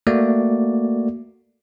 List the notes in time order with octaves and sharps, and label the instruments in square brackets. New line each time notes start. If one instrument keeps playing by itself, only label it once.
[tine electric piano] A3 A#3 F#4 D5